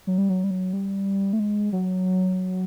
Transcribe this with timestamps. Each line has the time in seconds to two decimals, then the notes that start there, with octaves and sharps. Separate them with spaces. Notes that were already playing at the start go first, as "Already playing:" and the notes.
0.07 F#3
0.18 G3
0.29 F#3
0.44 G3
0.51 F#3
0.73 G3
1.33 A3
1.39 G#3
1.72 F#3